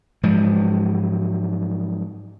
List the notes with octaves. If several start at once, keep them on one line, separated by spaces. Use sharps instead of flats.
G#2 F3 F#3 G#3